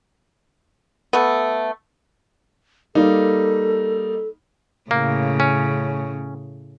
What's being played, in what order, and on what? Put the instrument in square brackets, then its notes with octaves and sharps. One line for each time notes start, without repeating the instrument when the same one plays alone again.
[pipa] A3 B3
[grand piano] G3 A#3 D#4 [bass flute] A4
[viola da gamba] A2 C#3 [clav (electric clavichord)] A#3
[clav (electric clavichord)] C#4